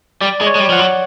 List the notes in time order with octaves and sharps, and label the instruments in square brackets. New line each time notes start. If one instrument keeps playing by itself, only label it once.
[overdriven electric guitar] G3 [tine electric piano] D5
[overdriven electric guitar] G#3
[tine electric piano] C#5
[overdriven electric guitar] G#3
G3
[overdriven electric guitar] F3 [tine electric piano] F#5
[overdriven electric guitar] F#3